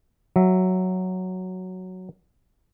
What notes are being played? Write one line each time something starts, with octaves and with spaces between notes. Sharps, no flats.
F#3 E5